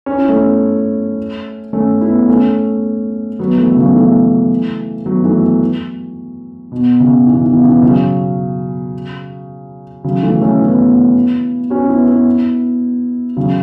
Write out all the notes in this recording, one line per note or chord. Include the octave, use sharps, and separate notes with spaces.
C#4
E4
A3 C#4
A3 C#4
B3 E4
A3 C#4
F#3 B3
E3 A3
C#3 F#3
E3 A3
F#3 B3
E3 A3
B2
C#3
B2 E3
B2 E3
C#3
B2 E3
C#3 F#3
C#3 F#3
E3 A3
A3 C#4
B3 E4
C#4 F#4
B3 E4
B3 E4
C#3 F#3